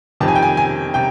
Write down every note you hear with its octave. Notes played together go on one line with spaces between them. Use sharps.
F2 C3 D#3 A5
G#5
G5
G#5
G#5
C3 G5